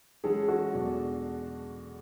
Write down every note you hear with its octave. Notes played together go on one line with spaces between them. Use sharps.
E3 G#3 C#4 F#4 G#4 A4
F#4 A4
E2 B2 G#3 D4 G#4